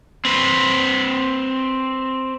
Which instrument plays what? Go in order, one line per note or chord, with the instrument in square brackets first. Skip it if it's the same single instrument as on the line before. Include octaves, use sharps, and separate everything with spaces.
[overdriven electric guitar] C4 B4